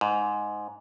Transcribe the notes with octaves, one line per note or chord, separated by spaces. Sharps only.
G#2